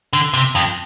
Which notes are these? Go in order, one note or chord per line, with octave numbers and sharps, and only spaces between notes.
D3
C3
F2